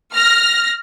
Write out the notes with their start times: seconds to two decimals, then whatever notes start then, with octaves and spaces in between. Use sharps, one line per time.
0.15 F6 A#6